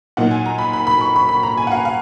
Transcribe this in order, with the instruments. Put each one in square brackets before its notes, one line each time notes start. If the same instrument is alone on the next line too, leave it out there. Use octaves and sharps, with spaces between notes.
[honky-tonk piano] A#2 F#3 A#3 D#4 F#5
G#5
A#5
B5
B5
B5
C#6
B5
B5
A#5
G#5
F#5
F5
F5